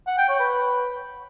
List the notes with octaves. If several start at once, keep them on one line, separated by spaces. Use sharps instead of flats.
F#5
G5
C#5
B4